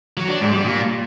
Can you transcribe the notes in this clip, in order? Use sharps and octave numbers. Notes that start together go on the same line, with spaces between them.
F#3
D4
G#2
G3
A#2